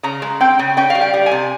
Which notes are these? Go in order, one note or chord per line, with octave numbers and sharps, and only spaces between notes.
C#3 A#5
G#3
C4 G5
C#3
C#4 G5
F5
G3
G5
G3
G#5
C3